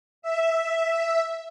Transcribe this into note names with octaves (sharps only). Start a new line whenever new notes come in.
E5